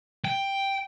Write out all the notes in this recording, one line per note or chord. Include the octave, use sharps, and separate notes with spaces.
G5